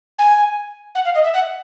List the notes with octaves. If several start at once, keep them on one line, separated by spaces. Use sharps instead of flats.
G#5
F#5
F5
D#5
E5
F#5